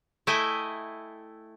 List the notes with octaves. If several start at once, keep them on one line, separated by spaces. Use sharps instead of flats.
A3 E4 D#5 G5 G#5